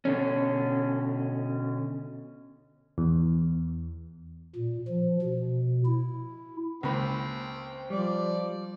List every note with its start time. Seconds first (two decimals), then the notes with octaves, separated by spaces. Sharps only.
0.05 B2 D3 C#4
2.98 E2
4.56 A#2
4.88 F3
5.22 B2
5.86 E4
6.83 C#2 A#3 C4 B5
7.90 F3 G3 D5